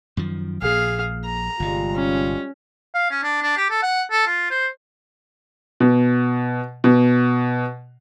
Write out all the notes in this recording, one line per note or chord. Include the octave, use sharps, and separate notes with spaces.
F#2 D#3 F3
A#1 A#2 G#4 F5
A#5
G1 C3 G3 G#3 F4
C#4
F5
C#4
D4
D4
G4
A4
F#5
A4
F4
C5
B2
B2